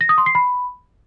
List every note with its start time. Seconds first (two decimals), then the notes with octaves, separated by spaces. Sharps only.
0.01 A#6
0.09 D#6
0.18 C6
0.26 C7
0.35 B5